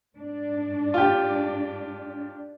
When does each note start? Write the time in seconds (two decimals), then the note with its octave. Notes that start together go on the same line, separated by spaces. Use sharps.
0.16 G#2 D4
0.94 F4 G4